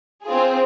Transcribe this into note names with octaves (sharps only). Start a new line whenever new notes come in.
C4 F4 G#4